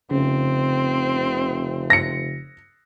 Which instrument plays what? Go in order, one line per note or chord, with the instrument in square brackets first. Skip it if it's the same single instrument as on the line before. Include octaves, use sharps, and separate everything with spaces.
[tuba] F1 [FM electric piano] C#3 [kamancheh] C4
[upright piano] A#6 C#7